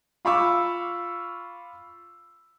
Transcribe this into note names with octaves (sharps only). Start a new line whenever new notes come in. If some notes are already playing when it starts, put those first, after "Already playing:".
F4 F5 B5 C#6 D6 E6